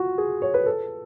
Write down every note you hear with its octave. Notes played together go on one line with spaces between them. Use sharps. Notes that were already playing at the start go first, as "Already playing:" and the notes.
Already playing: F4 F#4
G#4
C#5
B4
A4